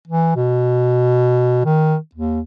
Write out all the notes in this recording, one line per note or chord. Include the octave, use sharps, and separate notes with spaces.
E3
B2
D#3
D#2